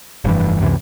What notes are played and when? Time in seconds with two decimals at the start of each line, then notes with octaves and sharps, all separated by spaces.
0.24 F1 G2 E3
0.60 C#2 F#2 C3 E3